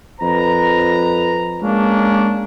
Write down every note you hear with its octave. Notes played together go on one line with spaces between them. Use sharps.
F2 B4 A#5
G#3 A#3 C#4 D4